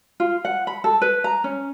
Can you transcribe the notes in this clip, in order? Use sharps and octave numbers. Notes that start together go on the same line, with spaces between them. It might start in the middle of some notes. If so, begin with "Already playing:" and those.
F4
F#5
B5
A4
B4
A#5
C#4